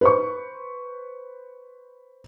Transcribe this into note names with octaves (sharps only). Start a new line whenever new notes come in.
B4 C5 C#6